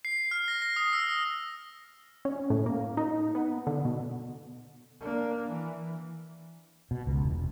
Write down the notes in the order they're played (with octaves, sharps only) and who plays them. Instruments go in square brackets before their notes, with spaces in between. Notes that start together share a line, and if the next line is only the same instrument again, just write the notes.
[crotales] C7
F6
A#6
A#6
D#6
E6
[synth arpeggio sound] C#4
A2
A#3
D#4
B3
D3
B2
[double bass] A#3 D4
E3
[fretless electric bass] B2
C#2
E1